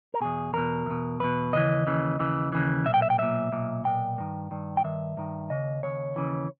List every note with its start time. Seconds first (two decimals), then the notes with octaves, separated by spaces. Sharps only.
0.14 A#4
0.21 E2 B2 G#4
0.53 E2 B2 A#4
0.86 E2 B2
1.20 E2 B2 B4
1.53 D#2 C#3 E3 D#5
1.87 D#2 C#3 E3
2.19 D#2 C#3 E3
2.52 D#2 C#3 E3
2.85 B1 A#2 E5
2.94 G5
3.02 E5
3.10 G5
3.18 B1 A#2 E5
3.52 B1 A#2
3.84 B1 A#2 G5
4.18 G2 D#3
4.51 G2 D#3
4.77 G5
4.84 G2 D#3 E5
5.17 G2 D#3
5.50 D#2 C#3 D#5
5.83 D#2 C#3 C#5
6.16 D#2 C#3 E3